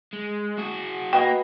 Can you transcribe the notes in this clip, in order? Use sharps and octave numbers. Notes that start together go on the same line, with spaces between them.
G#3
F#4 G#4
A#3 F#4 B4 D#5 G5